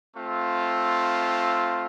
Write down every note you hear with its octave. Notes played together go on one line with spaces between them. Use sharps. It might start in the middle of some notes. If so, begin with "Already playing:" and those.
A3 C4 F4